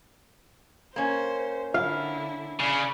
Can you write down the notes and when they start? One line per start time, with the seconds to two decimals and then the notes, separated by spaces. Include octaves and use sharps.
0.96 A#3 C#4 C5
1.74 D3 E4 F5
2.60 C#3 D5 B5